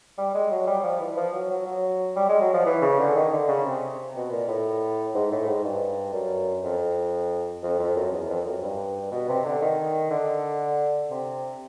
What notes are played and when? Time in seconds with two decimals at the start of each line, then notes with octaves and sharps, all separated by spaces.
0.18 G3
0.34 G#3
0.51 F#3
0.67 G3
0.84 F3
1.00 E3
1.17 F3
1.33 F#3
1.50 F#3
1.66 F#3
2.16 G3
2.29 G#3
2.41 F#3
2.53 F3
2.66 E3
2.82 C#3
2.99 D3
3.15 D#3
3.32 D3
3.48 C#3
3.65 C3
4.15 B2
4.31 A#2
4.48 A2
5.15 G#2
5.31 A2
5.47 G#2
5.64 G2
6.13 F#2
6.63 F2
7.63 F2
7.79 F2
7.96 F#2
8.12 E2
8.29 F2
8.46 F#2
8.62 G2
9.11 B2
9.29 C3
9.45 D3
9.62 D#3
10.11 D3
11.10 C3